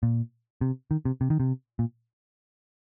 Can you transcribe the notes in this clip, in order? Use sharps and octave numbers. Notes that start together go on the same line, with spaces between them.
A#2
C3
D#3
C3
C3
D#3
C3
A#2